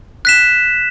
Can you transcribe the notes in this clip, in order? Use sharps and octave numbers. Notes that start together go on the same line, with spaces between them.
F#6 B6 E7